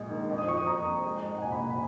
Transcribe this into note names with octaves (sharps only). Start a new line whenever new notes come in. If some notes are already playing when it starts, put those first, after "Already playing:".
Already playing: A#1 G#3
D#3
F2
D#6
F3 C#6
D#6
F2 A#5
F2
G#3
G#2
F#5
A#1 G#5
B5
A#1 A#5
B5